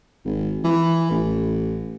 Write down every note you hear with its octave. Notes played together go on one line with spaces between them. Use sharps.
G#1
E3
A1